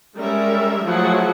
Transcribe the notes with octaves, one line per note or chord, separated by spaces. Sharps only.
G3 G#3 C#4 A#4 E5
F3 F#3 A3 E4 G#4 F#5